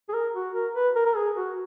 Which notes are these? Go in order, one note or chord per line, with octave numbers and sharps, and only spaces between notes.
G#4
A#4
F#4
A#4
B4
A#4
A#4
G#4
F#4